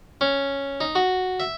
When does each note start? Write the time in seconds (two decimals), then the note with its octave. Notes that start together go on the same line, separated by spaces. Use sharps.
0.21 C#4
0.81 D#4
0.95 F#4
1.40 E5